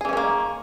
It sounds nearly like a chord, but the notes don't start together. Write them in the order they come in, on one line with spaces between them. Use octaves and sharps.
G#4 E3 C#4 D#3 A#3